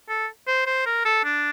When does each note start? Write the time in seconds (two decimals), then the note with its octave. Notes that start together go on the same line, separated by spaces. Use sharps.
0.09 A4
0.48 C5
0.66 C5
0.86 A#4
1.05 A4
1.24 D4